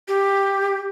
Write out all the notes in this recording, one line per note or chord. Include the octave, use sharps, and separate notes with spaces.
G4